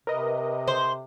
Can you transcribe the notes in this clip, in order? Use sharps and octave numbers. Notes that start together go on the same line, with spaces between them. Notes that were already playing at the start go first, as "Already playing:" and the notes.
C3 A#4 B4 D#5
C5